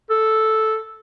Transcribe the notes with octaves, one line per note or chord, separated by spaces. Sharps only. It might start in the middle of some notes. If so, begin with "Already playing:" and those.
A4